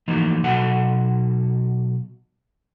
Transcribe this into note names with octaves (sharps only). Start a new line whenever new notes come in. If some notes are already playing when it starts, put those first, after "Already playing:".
E3 F3 A3 A#3 D#4 F#4
B2 F#3 F#4 A4 F#5 A5